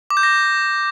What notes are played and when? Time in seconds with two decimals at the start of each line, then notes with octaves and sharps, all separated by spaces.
0.10 D6
0.17 G6
0.23 A#6